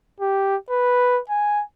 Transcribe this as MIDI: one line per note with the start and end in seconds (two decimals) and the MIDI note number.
0.20 0.56 67
0.70 1.20 71
1.30 1.62 80